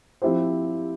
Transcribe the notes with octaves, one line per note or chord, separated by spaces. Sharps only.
F3 C4 E4 G4 C5